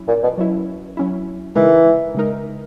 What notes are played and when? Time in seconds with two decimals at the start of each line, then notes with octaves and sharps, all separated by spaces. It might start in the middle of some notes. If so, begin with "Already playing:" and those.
Already playing: F#3 C#4 E4
0.08 A#2
0.23 B2
0.38 F#3 C#4 E4
0.97 F#3 C#4 E4
1.55 C#3 E3 G#3 D#4 A#4
2.15 C#3 G#3 D#4 A#4